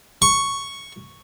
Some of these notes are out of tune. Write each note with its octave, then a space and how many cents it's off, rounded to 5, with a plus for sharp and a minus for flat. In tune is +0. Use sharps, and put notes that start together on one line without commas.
C#6 +0